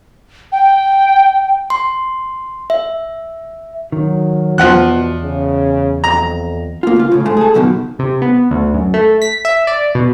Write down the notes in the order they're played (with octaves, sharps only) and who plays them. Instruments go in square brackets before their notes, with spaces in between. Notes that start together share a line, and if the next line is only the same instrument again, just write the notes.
[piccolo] G5
[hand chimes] C6
E5
[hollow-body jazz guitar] D#3 [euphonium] F#3
[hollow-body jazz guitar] E2 [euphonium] B2 [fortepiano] F3 F#5 F#6
[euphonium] C#3
[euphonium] F2 [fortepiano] A#5
[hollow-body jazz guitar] A#3 F4
C#2 F4
A2 C#3
G#2 G#3 A3
G#4 A4
C#2 F#2 B2 D#3
[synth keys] C3
B3
D2
F#2
A3
B6
E5
D5
B2